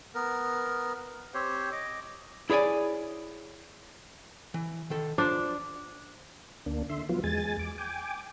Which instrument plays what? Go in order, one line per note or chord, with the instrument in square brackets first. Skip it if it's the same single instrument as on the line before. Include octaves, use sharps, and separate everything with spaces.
[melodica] B3 A#4
C4 G4 C5 C#5
D#5 D6
[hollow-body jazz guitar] E4 G#4 C#5 D5 G#5
E3
D#3 A4
[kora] D4 [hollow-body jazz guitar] F4 C5 A5
[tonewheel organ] D2 A#3 D4
D3 E5 C6
F3 F#3 B3 F4
E2 G#3 G#5 A6
D6
G5 G#5 D6